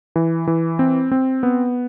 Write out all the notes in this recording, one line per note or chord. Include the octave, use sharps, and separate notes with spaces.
E3
E3
C4
C4
B3